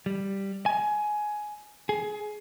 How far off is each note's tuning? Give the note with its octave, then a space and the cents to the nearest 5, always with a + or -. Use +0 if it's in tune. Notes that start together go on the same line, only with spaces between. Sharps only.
G3 +0
G#5 +15
G#4 +20